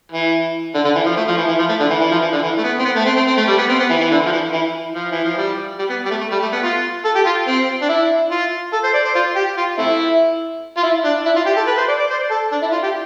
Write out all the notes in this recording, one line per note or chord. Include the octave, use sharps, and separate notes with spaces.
E3
D3
D3
E3
F3
A3
F3
E3
E3
F3
A3
D3
E3
E3
F3
E3
D3
E3
A3
B3
C4
B3
A3
C4
C4
C4
A3
G3
B3
C4
B3
E3
E3
D3
F3
E3
E3
F3
E3
F3
G3
G3
B3
G3
A3
A3
G3
A3
B3
F4
A4
G4
F4
C4
D4
E4
F4
A4
C5
D5
C5
F4
G4
F4
A3 C4 E4
F4
E4
D4
E4
F4
G4
A4
B4
C5
D5
D5
C5
A4
D4
E4
F4
G4